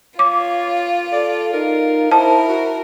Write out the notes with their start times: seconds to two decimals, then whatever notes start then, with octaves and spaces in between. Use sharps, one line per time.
0.19 F4 C#5 D6
1.12 A4 D5
1.54 D#4 A#4
2.11 E4 A#4 C5 A5
2.49 F#4